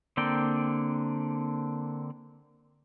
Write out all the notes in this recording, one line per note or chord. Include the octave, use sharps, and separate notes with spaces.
D3 A#3 C4 D5 G5